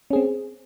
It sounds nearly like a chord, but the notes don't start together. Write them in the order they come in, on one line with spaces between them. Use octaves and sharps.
C#4 G#4 C4